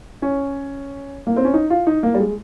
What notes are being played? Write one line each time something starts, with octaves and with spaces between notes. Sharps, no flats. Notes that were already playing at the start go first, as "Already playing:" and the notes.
C#4
A#3
C4
C#4
D#4
F4
D#4
A#3
G3
G#3